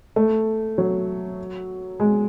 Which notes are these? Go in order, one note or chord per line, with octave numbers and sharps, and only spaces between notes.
A3
F#3
G#3